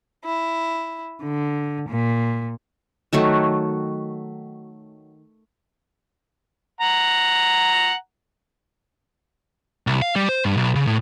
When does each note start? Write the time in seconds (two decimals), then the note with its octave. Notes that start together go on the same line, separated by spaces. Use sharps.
0.24 E4
1.22 D3
1.89 A#2
3.13 D#3 F#3 A3 F#4
6.81 F#5 A#5
9.87 C2
10.02 F5
10.16 G3
10.29 C5
10.45 G2
10.57 B1
10.75 C#3
10.87 A2